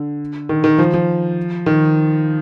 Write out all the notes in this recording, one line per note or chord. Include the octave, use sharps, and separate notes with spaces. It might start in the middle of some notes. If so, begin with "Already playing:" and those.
Already playing: D3
D#3
D#3
F3
F3
D#3